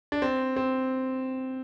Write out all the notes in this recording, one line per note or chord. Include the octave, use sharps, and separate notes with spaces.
D4
C4
C4